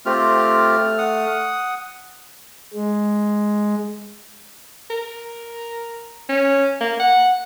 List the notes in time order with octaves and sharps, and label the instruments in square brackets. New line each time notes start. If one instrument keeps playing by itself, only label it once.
[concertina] A3 F6 [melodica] C4 F4 G4
[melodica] F#5 D#6
[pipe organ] G#3
[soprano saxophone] A#4
C#4
A#3
F#5